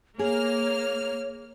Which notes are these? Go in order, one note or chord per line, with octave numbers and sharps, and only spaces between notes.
A#3 G#4 C#5 F6